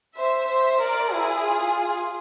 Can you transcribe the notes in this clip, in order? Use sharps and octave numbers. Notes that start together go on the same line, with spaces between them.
C5 E5
C5
A#4 D5
E4 G#4
F4